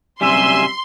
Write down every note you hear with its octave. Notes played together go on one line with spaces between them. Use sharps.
F#2 C3 G3 E5 G#5 C6